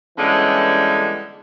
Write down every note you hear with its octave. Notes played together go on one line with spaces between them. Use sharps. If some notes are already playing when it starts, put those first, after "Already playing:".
D3 E3 G3 G#3 B3 C#4